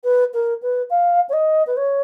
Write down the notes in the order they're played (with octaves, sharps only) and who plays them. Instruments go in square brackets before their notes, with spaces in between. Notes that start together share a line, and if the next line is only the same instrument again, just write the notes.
[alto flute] B4
A#4
B4
F5
C#5
D#5
B4
C#5